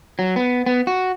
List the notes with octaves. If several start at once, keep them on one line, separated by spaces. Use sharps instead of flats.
F#3
B3
B3
F#4